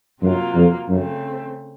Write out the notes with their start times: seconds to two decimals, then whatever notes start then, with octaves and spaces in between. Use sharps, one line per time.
0.21 F#2 C3 F#3 A#3 F4
0.54 F2
0.88 F#2 C#3 A3 C4